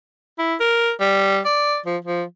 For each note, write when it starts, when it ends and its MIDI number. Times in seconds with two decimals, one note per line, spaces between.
0.39 0.55 64
0.60 0.91 70
1.01 1.39 55
1.45 1.78 74
1.86 1.97 53
2.05 2.23 53